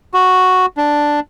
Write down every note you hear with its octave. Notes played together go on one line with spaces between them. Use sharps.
F#4
D4